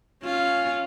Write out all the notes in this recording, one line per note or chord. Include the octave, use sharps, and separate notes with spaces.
C#4 F4